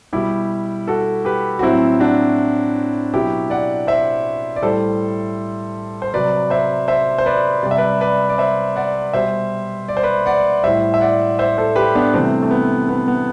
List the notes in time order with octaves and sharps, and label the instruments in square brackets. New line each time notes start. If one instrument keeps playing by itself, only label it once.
[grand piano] B2 G3 E4 G4
F#4 A4
G4 B4
F#4
A2 F#3 C4 E4
D4 F#4
B2 F#3 E4 G4
D5 F#5
C5 E5
D5
A2 G3 A4 C5
C5
C3 F#3 B4 D5
C5 E5
C5 E5
C5
B4 D5
C3 D5
G3
E5
B4 D5
B4 D5
D5
C5 E5
D5 F#5
B2 G3 C5 E5
D5
C5
B4 D5
D5 F#5
A2 G3 C5 E5
E5
D5 F#5
C5 E5
A4 C5
G4 B4
B3 D4
C3 E3 G3 A3 C4
A3
B3
B3
B3